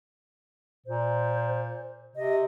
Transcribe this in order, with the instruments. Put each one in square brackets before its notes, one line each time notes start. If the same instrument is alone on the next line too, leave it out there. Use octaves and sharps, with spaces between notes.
[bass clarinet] A#2 [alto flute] C5
[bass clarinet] C3 [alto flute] D#5